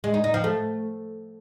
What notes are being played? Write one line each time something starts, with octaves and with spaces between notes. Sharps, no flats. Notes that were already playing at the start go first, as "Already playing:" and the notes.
G#3
D#4
D#4
F3
A3